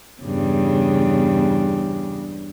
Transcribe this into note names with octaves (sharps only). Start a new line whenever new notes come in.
E2 G2 C#3